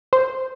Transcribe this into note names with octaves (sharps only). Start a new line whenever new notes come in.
C5